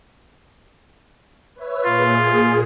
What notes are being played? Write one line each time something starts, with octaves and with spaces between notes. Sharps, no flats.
B4 C#5 E5
A#2 F4 G#4